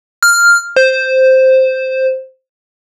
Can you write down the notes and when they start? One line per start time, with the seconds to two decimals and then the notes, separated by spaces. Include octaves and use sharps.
0.23 F6
0.77 C5